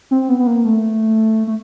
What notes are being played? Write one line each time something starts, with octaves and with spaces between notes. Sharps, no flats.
C4
B3
B3
A#3
A3
A3